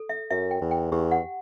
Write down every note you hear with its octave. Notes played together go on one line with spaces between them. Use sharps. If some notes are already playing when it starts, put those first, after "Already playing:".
Already playing: A4
E5
F#2 E5
G5
E2
G5
E2 G4
F#5